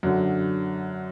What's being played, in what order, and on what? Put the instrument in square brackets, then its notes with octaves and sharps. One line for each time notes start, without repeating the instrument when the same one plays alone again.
[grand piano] F#2 D3 F#3